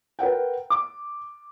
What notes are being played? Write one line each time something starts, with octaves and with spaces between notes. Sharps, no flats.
A#4 B4 F#5 G5
D6